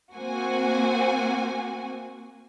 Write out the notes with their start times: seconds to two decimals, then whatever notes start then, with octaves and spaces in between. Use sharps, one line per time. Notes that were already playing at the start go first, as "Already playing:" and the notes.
0.14 A#3 C4 F#4 G#5